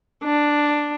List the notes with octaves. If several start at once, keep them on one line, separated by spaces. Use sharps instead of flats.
D4